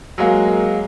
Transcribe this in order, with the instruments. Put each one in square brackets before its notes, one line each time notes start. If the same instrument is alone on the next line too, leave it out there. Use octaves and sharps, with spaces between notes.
[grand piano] F#3 G#3 A#3